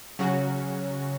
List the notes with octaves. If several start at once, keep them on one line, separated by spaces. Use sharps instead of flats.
C#3 F#3 C#4 F#4